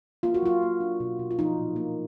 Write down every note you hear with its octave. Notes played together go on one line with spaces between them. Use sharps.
A#3 F4
F#4
F#3 F4
A#3
D4
B2
B2
F4
F3 D#4
A#2
A#3